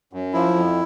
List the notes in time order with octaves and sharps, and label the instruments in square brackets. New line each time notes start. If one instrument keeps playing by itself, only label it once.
[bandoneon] F#2
F3 E4
F2